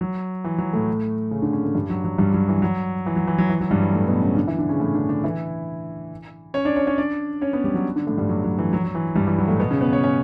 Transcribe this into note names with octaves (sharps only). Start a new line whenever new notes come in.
F#3
E3
F#3
A2 A3
C#3 C#4
D3 D4
C#3 C#4
A2 A3
G2 G3
F#3
F#3
G2 G3
F#3
E3
F#3
E3
F#3
E3
F#3
E3
F#3
G2 G3
E3
A2 A3
B2 B3
C#3 C#4
D3 D4
E3 E4
D3 D4
C#3 C#4
A2 A3
D3 D4
D3 D4
E3 E4
C#4 C#5
D4 D5
C#4 C#5
C#4 C#5
D4 D5
C#4 C#5
B3 B4
G3 G4
F#3 F#4
D3 D4
A2 A3
G2 G3
F#3
F#3
E3
F#3
F#3
E3
G2 G3
E3
F#3
A2 A3
B2 B3
C#3 C#4
B3 B4
C#4 C#5
C#4 C#5